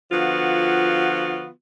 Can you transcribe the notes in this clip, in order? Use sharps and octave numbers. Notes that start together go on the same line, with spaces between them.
D3 F3 B3 F4 F#4